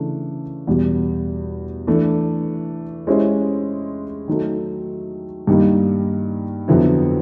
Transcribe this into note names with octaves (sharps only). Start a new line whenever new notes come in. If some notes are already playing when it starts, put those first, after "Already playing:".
Already playing: C#3 E3 A3 D4
E2 B2 G3
E3 A3 D4
G#3 C#4 E4 G4 C5
D#3 F#3 A3
G2 D#3 G3 A#3
F2 D3 F#3 B3 E4